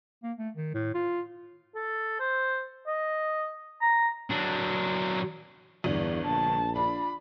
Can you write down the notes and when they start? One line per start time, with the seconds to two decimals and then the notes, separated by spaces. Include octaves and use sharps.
0.23 A#3
0.38 A3
0.56 D#3
0.74 A2
0.94 F4
1.75 A4
2.19 C5
2.87 D#5
3.81 A#5
4.30 F#3 D4
5.84 G1 E2 G2 D5
6.24 A#1 A5
6.76 D4 F4 B5